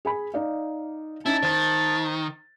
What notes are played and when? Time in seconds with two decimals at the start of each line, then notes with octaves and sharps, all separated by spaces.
0.05 G#4 G#5 B5
0.34 D#4 D5 F5
1.26 C#4 D#4 E4 A5
1.43 D#3 C5 A6